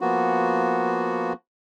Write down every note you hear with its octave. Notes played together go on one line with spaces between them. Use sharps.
F3 A#3 B3 F#4